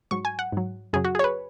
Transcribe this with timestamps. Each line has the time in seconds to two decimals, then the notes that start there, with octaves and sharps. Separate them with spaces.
0.11 G#2 F#3 C#6
0.25 G#5
0.39 F#5
0.52 G#2 F#3
0.93 F#2 C#3 F#3 G#4
1.04 F#4
1.15 G#4
1.19 C#5
1.24 B4